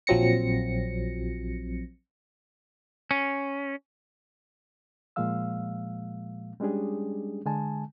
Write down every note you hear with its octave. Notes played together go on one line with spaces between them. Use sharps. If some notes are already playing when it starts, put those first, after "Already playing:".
A#1 F3 F#3 C4 A#6 C#7
C#4
A#2 F3 G#3 A#3 F5 E6
G3 G#3 C#4 D4 G4 G#4
D3 G#3 G#5 A5